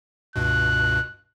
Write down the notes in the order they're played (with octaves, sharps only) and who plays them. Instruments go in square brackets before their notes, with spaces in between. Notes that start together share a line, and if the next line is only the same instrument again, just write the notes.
[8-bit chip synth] C#2 G2 B2 [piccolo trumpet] F#6